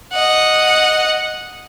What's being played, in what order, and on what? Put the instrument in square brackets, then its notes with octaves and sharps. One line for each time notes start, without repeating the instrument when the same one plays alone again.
[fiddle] D#5 F#5